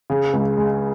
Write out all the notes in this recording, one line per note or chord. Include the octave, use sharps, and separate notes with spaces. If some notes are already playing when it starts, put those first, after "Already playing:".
C#3
C#2
G#3